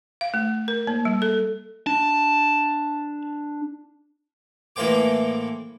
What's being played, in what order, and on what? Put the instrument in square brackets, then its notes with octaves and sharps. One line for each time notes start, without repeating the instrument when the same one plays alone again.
[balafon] F5
A3
A#4
A#3
G3
A4
[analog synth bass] D4 [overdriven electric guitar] A5
[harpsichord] A2 E3 A#3 C5 G5 D6